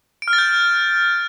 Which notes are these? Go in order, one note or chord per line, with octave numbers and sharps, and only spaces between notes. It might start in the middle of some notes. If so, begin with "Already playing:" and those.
D7
F6
A6
G6